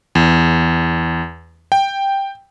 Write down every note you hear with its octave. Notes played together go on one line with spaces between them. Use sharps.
E2
G5